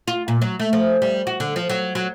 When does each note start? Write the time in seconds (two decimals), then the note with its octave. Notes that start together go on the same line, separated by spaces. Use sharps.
0.08 F4
0.28 A#2
0.42 F#3
0.60 A3
0.73 F3
1.02 G3
1.27 F#4
1.40 D3
1.56 F3
1.69 F#3
1.95 F#3